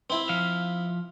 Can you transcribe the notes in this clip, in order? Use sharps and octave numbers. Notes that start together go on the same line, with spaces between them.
C4 E4
F3 F5